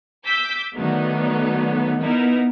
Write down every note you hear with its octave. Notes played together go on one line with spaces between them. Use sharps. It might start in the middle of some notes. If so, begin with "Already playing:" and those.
D6 E6 G6 B6
D3 D#3 F#3 A3 B3 D#4
B3 D#4 E4 A#4 B4